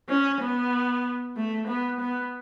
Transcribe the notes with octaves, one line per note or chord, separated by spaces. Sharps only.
C#4
B3
A3
B3
B3